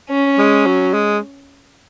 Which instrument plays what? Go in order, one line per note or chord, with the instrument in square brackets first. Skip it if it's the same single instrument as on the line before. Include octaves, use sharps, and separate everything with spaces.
[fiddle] C#4
[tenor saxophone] G#3
F#3
G#3